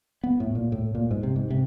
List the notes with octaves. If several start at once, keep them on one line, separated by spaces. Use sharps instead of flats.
B3
A2
A#2
A2
A#2
G#2
C3
G#2
C3